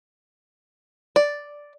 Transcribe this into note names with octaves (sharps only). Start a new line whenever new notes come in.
D5